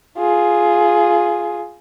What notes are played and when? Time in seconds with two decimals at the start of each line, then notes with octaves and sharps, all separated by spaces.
0.18 F4 G#4